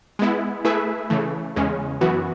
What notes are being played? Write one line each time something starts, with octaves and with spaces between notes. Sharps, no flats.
G#3 B3 E4
A3 E4 G#4 B4 E5
C#3 E3 A3
E2 C#3 G#3 C#4
F#2 E3 B3 F#4